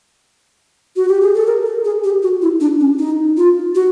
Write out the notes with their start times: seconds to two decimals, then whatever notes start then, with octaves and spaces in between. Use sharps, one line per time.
0.96 F#4
1.08 G4
1.21 G#4
1.34 A4
1.47 A#4
1.65 A4
1.85 G#4
2.04 G4
2.23 F#4
2.42 E4
2.60 D4
2.80 C#4
2.99 D#4
3.37 F4
3.75 F#4